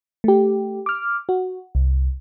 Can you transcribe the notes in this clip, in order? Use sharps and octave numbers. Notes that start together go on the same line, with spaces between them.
A3 G4
D6 F6
F#4
C2